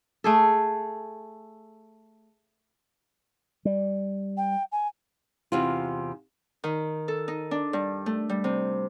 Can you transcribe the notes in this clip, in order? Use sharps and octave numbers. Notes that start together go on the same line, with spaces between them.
A3 G#4 A4
G3
G5
G#5
E2 C3 F4
D#3
A4
D#4
D4
G2
A3
G3
C3